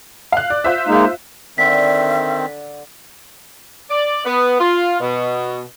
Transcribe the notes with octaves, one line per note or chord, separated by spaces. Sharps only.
F5 F#6
D5
F4 C5 E5
G#3 A#3 D#4
D3 D#3 C4 E5 B6
D5
B3
F4
B2